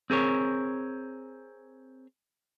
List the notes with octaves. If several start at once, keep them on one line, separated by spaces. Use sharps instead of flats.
C4 G#4 A#4 C#5